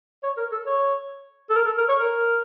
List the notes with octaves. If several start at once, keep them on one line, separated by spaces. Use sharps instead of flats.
C#5
A#4
A4
C#5
A4
A#4
A4
A#4
C#5
A#4